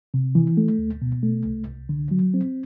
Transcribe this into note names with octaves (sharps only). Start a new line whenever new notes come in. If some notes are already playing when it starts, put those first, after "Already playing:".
C3
E3
A3
D2
B2
A3
C2
C2
D3
F#3
C4